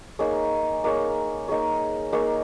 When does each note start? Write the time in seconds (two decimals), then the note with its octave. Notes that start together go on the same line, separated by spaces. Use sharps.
0.19 A#3 D#4 G#4 C#5
0.84 A#3 D#4 G#4 C#5
1.48 A#3 D#4 G#4 C#5
2.12 A#3 D#4 G#4 C#5